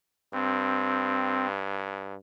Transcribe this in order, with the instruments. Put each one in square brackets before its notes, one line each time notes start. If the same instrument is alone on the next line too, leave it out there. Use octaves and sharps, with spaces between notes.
[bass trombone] G2 [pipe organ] C4